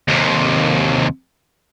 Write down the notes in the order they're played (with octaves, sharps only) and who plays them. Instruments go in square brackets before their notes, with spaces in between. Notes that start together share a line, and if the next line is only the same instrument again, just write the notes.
[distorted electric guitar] D#2 C3